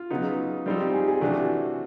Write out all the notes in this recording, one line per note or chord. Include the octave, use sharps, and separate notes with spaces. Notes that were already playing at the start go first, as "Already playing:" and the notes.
Already playing: F4
C#3 F#3 B3 D#4
G3 C4 D#4 F4
G4
G#4
G#4
C3 E3 A3 D4 F#4